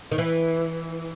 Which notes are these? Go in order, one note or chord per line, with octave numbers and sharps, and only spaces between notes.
D#3
E3